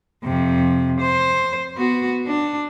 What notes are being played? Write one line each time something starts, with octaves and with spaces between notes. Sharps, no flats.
F2 C3
C5
B3 F#4
D4